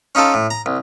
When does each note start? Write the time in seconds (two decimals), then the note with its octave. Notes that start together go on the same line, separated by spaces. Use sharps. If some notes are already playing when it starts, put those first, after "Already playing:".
0.15 C#4 D#4 F4 A4
0.34 A2
0.50 A#5
0.66 C2